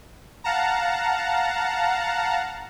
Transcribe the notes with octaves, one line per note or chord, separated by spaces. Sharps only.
F5 F#5 A5 A#5